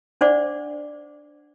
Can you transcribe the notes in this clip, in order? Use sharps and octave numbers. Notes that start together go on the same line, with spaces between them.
D4 C5 D5 F#5 D6